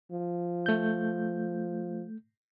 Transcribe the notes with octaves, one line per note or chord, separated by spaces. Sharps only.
F3
A3 G6